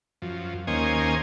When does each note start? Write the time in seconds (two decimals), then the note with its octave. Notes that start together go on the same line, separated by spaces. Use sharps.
0.22 F#2 F3
0.67 D#2 A#3 C#4 C5 D#5 G#5